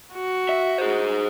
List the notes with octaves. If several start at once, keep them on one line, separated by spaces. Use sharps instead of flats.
F#4
E5
G#4 C5